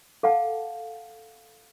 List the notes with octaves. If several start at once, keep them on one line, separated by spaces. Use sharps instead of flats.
A4 F5 F#5 A5